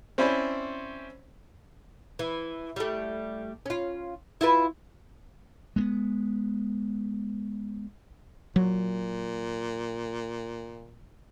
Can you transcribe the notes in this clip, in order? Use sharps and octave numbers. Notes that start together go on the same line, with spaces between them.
C4 C#4 E4 C5 D5 B5
E3
G3 A3
C#4 F4
E4 F4 B4
G#3 A3 B3
A#2 F#3